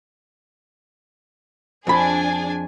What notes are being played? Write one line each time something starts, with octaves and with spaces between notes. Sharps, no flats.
F2 D4 G#4 G#5 B5